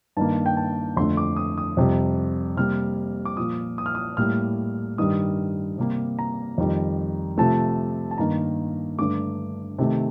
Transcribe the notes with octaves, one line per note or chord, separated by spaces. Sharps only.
G2 D#3 A#3 A5
G5
A5
F2 D3 A3 C6
D6
D#6
D#6
F2 C3 G3
C3 G3 A#3 F6
D6
A#2 F3 A#3 D#6
D#6
F6
D#6
A2 G3 A#3 F6
G2 D#3 G3 D#6
C3 G3 A#3
A#5
F2 D#3 G3
C3 F3 A3 A5
A5
G2 D#3 A#3 A#5
G2 D3 A3 D6
C3 D#3 A3